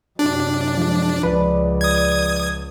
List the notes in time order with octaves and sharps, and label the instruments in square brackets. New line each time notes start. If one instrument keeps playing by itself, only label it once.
[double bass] F#2 C3 [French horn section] F#3 G4 [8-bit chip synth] D4
[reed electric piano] F3 [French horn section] G#3
[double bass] C#2 [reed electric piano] F3 B4 [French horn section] D5
[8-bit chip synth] D#6 G#6